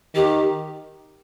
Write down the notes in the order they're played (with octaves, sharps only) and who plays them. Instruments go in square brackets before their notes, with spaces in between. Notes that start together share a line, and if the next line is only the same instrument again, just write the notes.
[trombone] D#3 [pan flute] G4